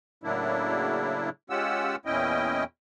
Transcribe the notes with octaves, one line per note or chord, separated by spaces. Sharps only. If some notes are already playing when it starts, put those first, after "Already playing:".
A2 C#3 F#3 A#3 D4 E4
G#3 C#4 F4 G4 F#5 E6
E2 A#2 C#4 E4 D#5 G5